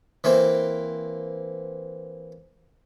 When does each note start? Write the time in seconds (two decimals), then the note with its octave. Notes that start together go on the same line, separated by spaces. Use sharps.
0.24 E3 A#3 C4